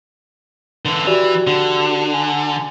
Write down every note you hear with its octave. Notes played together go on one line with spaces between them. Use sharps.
D3 E3
E3 F#4 G4 D5
D3
G#5